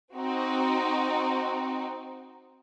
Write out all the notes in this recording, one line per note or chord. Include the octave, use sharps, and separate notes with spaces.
C4 D#4 F#4